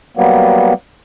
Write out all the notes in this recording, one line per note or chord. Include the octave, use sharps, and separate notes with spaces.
F#3 G3 A#3 B3